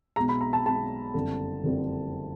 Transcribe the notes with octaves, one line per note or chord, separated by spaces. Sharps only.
B1 B2 G#3 A#5
B5
A#5
A5
B1 B2 G#3 A5
F#1 F2 D3 G3
F#1 F2 D3 G3